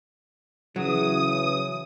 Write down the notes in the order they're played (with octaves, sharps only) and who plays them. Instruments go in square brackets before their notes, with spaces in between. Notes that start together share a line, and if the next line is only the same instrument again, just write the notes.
[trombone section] C#3 E3 [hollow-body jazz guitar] F#3 [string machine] D#6